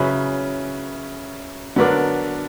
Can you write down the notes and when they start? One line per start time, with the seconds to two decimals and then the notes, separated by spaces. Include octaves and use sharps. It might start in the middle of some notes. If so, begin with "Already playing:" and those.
Already playing: C#3 F#3 C#4 E4 B4
1.76 D3 F#3 B3 D4 A#4